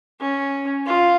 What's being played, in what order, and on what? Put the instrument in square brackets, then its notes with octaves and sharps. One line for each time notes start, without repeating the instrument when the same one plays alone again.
[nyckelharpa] C#4
F4